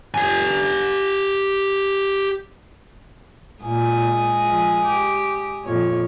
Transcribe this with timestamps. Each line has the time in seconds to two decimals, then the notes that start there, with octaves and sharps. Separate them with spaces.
0.14 G4 G#5
3.62 A#2 G#3 G#5 D#6
4.44 F3
4.83 G4
5.64 F2 A#2 C#5